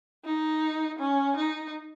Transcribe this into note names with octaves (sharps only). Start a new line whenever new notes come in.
D#4
C#4
D#4